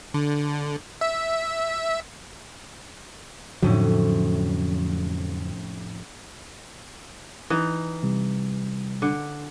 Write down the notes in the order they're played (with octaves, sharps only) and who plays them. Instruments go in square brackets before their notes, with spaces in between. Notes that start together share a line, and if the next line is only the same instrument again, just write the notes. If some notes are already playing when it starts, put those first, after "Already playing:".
[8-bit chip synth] D3
E5
[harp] F1 A2 C#4 [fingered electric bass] F2 D3 F#3
[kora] E3 D#4
[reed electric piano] C3 G3
[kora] D3